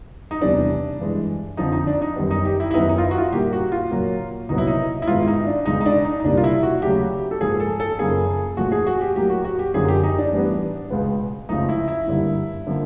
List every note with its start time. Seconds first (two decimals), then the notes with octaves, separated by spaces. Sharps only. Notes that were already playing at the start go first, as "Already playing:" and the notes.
0.31 D#4
0.41 E2 C3 E3 G3 B3 D4
1.00 G2 E3 G#3
1.57 F2 D3 F3 D#4
1.72 D#4
1.87 D4
2.02 D#4
2.16 F#2 D#3 G3 B3
2.31 D#4
2.45 G4
2.60 E4
2.71 E4
2.74 F#2 D#3 F#3 B3 D#4
2.89 D#4
2.98 F4
3.03 E4
3.11 F#4
3.18 F4
3.33 A#2 G3 A#3 G4
3.53 F#4
3.72 F4
3.91 A#2 F#3 A#3
4.49 C2 A#2 F#3 B3 D#4
4.58 E4
4.67 D#4
5.02 E4
5.07 G#2 D#3 G#3 B3 F4
5.22 E4
5.28 D#4
5.47 D4
5.66 C#2 B2 G#3 D#4
5.81 D#4
5.86 D4
6.05 D#4
6.20 D#4
6.24 C2 A#2 G3 A#3 D4
6.37 F4
6.44 E4
6.63 F#4
6.82 D#2 C#3 F#3 A3 G4
7.31 A4
7.41 G#2 F3 A#3 G#4
7.60 A4
7.80 A4
7.99 F#2 C#3 F3 A#3 G#4
8.57 A#2 F3 A3 F#4
8.72 G#4
8.87 F#4
9.01 G4
9.16 A2 F#3 A#3 G4
9.30 F#4
9.45 F#4
9.59 G4
9.74 F#2 D3 F3 A#3 G#4
9.89 G4
10.03 D#4
10.18 D4
10.32 A2 E3 G3 B3
10.90 C#2 B2 G#3 B3
11.49 C#2 C#3 F3 A3 D#4
11.69 E4
11.88 E4
12.07 G2 D3 G3 A#3
12.67 D3 F3 A#3